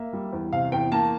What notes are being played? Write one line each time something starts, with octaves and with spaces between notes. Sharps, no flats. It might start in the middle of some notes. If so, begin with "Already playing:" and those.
Already playing: A#3 E5
G3
E2
C3 F5
E2 G5
A#3 A5